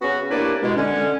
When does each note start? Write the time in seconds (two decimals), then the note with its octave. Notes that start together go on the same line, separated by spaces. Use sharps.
0.02 C#3 B3 C#4 F#4
0.31 C2 A#3 D4 E4 B4 D5
0.62 B2 G#3
0.76 D3 C#4